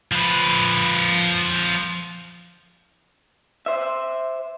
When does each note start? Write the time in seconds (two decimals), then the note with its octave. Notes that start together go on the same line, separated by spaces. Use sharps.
0.12 F3 B4
3.66 C5 E5